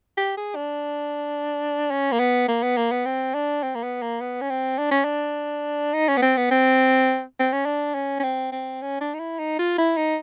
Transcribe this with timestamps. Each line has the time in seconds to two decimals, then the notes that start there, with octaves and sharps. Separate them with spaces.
0.17 G4
0.37 G#4
0.56 D4
1.91 C#4
2.12 A#3
2.20 B3
2.48 A#3
2.63 B3
2.77 A#3
2.91 B3
3.06 C4
3.34 D4
3.63 C4
3.75 A#3
3.83 B3
4.02 A#3
4.21 B3
4.41 C#4
4.50 C4
4.78 D4
4.91 C#4
5.05 D4
5.94 D#4
6.09 C#4
6.17 B3
6.22 C4
6.37 B3
6.51 C4
7.40 C4
7.53 C#4
7.66 D4
7.95 C#4
8.20 C#4
8.23 C4
8.52 C4
8.82 C#4
9.01 D4
9.14 D#4
9.19 E4
9.39 D#4
9.59 F4
9.78 E4
9.97 D#4